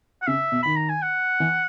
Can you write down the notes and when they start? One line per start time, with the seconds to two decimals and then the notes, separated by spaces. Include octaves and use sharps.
0.22 F#5
0.27 C#3 E5
0.52 B2
0.63 D#3 B5
0.76 A#5
0.89 G#5
1.03 F#5
1.40 E3